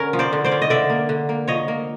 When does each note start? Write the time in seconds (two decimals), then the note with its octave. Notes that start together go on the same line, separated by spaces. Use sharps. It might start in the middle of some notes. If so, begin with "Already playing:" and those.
Already playing: D3 C#4 A#4
0.13 F3
0.19 C5 D5
0.33 D3
0.44 C5 D5
0.51 C#4
0.62 D#5
0.70 D3 D5 E5
0.90 A#3
1.09 D3
1.29 A#3
1.48 F3 C#5 D#5
1.68 A#3